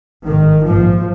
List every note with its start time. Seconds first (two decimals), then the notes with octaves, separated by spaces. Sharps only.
0.26 G#1 G#2 D#3
0.66 A#1 G#2 F3